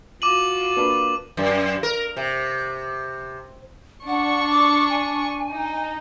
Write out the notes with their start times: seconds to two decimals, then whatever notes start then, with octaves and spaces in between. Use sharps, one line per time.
0.22 F4 F#4 D6 D#7 F#7
0.77 A#3 D4 B4
1.37 F#2
1.83 A#4
2.17 C3
4.07 D4 F#5 C#6
4.50 D6
4.89 G#5
5.52 D#4